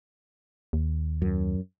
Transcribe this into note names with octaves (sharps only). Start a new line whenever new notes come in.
D#2
F#2